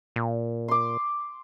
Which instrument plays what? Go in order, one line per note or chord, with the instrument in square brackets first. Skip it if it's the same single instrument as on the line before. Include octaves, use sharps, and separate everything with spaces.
[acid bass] A#2
[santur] C6 D6